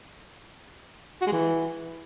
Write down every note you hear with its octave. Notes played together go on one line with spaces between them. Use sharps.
F#4
G#3
E3